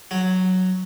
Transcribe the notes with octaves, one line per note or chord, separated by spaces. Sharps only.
F#3